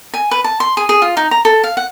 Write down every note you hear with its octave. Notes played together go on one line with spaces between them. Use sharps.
G#5
B4
A5
C6
G#4
G#4
F4
D#4
A#5
A4
F5
F#5